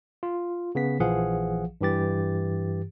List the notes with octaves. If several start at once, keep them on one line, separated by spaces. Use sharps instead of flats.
F4
C#3 B3 B6
A#1 E3 F3 G#4 F5 F#5
G2 E3 G4 A6